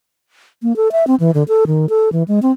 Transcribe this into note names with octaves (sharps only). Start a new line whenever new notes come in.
A#3
A4
E5
C4
E3
D3
A4
D#3
A4
E3
G#3
C4